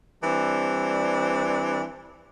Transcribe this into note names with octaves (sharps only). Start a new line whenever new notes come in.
E3 G3 C4 D4